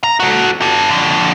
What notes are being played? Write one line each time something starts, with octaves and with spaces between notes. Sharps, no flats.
A#5
F#4 A4
G4 A4
F2 D3